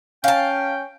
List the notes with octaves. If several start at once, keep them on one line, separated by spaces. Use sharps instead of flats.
C#4 F5 G5 A5